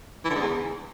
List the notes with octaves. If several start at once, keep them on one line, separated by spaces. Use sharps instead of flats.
E3
D3
G#2
E2